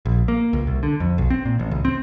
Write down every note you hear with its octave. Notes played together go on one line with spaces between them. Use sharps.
A#1
A#3
C#2
C2
D3
F2
B1
C4
A#2
A1
C#2
C4